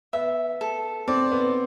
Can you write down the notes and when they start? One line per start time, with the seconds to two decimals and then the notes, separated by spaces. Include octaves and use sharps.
0.13 B3 E5
0.61 A4
1.08 C4 D5
1.32 B3